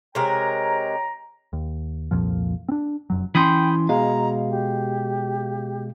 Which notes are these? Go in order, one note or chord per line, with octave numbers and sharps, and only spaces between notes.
C3 G#3 A#4 C#5 G5 A#5
D#2
C2 F2 A#2 F3
C4 D4
F1 F#2 F#3
E3 C#4 G5 B5 C6 D#6 G6
B2 G#3 F5 A#5
G4